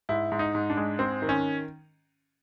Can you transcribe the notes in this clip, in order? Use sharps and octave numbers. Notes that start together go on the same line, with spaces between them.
G#2 E4
G#2
D#4
G#2
D4
G#3
G#2 C4
D#3
C#4